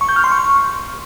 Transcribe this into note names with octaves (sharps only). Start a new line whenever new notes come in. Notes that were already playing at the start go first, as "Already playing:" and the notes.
C#6
G6
F6
C6
C#6